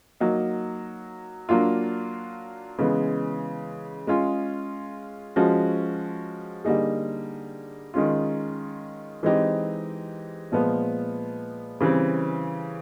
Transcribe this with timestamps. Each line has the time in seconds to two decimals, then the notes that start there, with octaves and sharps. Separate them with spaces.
0.20 F#3 A#3 D#4
1.49 F#3 A#3 D4 F4
2.78 C#3 E3 G#3 B3
4.07 G#3 C#4 F4 G#4
5.36 F3 G#3 C#4 F#4
6.65 D3 G3 A#3 D#4 G#4
7.94 D#3 G#3 C#4 F4
9.23 E3 G#3 C4 D#4 G4
10.52 A#2 F3 G#3 B3
11.80 C#3 E3 G3 C4